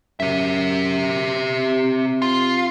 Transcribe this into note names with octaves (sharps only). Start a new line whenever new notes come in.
F#2 G4 E5
C3
F4